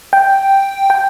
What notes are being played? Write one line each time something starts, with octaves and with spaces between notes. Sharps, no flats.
G5
G5